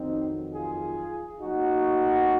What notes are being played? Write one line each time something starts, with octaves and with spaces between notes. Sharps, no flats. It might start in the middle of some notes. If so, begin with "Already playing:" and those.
Already playing: F2 D#3 F#3 C4 D#4
F4 G#4
A#2 F#3 D#4 F#4